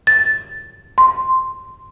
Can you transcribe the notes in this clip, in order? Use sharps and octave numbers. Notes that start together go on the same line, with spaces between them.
A6
C6